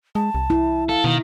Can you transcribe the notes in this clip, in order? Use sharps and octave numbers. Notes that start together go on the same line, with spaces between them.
G#3 A5
C2
E4
A4 F5
B2 D#3